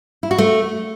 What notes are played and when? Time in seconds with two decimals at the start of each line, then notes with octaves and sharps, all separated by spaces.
0.23 E4
0.31 F#4
0.38 A3